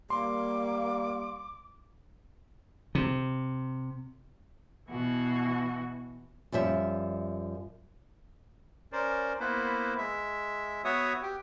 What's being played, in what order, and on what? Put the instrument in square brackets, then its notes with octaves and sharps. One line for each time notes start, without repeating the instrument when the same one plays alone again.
[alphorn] G3 [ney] A#3 [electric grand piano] C6 [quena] D6
[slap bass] C3
[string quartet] B2 E3 F#4
[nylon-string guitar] F#2 F3 G3 E5
[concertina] C#4 A#4 C5 D5
A#3 B3 E4 B4 C5
G#3 E5
B3 F#4 C#5 E5 D#6
G4